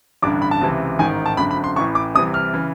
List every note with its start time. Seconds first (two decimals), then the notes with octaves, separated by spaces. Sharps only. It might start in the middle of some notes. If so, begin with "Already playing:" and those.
0.22 A1 G2 D3 D6
0.42 B5
0.51 A5
0.61 C#2 C3 E3
0.99 A1 G#2 D#3 G#5
1.26 A5
1.37 G#1 F#2 D3 B5
1.51 B5
1.64 C6
1.76 A1 A2 E3 C#6
1.95 D6
2.15 C2 C3 E3 D#6
2.34 F6
2.54 C#3 E3